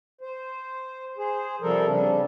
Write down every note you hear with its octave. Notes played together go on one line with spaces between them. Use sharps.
C5
G#4 C5
C3 F3 G3 A4 A#4
C#3 G3 D4